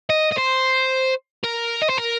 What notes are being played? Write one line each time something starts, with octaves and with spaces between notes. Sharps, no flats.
D#5
D#5
C5
A#4
D#5
C5
A#4